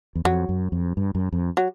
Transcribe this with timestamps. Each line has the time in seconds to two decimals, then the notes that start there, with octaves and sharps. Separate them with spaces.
0.15 E2
0.25 F2 F#3
0.49 F#2
0.72 F2
0.97 G2
1.15 F#2
1.33 F2
1.57 F#3